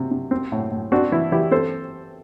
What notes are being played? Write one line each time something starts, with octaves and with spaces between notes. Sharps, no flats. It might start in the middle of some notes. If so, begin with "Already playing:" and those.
Already playing: C3
C3
C4
A2
A2
C4 D4 F#4
E3 E4
E3 E4 G4
C4 A4 C5